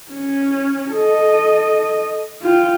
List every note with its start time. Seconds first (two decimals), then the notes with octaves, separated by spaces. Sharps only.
0.12 C#4
0.92 A4 D#5
2.42 F4 G5